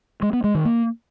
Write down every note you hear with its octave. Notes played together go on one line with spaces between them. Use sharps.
G#3
B3
G#3
D#3
A#3